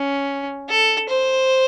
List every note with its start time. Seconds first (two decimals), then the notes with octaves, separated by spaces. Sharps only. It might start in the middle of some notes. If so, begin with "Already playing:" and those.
Already playing: C#4
0.69 A4
1.09 C5